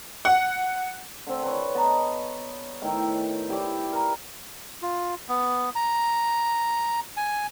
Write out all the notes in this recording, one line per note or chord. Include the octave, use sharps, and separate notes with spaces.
F#5
D3 C4
B4 C#5
B3 D#5 A5 A#5
A2 D#3 G5
E4 G4 D5 D6
A#4
F4
B3
A#5
G#5